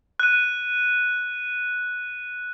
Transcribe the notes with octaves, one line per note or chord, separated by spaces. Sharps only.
F#6 D#7